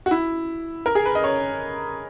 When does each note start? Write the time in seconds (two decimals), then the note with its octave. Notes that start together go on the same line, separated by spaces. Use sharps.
0.06 F#4
0.11 E4
0.86 A#4
0.95 G#4
1.05 B4
1.15 D#5
1.24 C#5